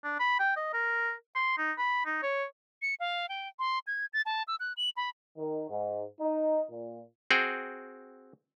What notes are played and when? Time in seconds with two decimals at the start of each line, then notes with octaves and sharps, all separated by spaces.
0.04 D4
0.20 B5
0.40 G5
0.57 D#5
0.73 A#4
1.35 C6
1.58 D#4
1.78 B5
2.06 D#4
2.23 C#5
2.82 C#7
3.00 F5
3.29 G5
3.59 C6
3.87 G#6
4.13 A6
4.26 A5
4.48 E6
4.60 F#6
4.77 F#7
4.97 B5
5.37 D#3
5.70 G#2
6.20 D#4
6.69 A#2
7.31 C4 F#4 G#4 G5